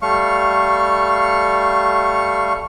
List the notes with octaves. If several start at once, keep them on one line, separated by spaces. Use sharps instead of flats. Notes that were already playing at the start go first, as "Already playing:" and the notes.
G3 A3 F5 C#6